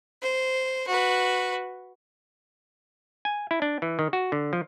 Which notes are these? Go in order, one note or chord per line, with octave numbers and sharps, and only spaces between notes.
C5
F#4 B4
G#5
E4
D4
E3
D#3
F#4
D3
F3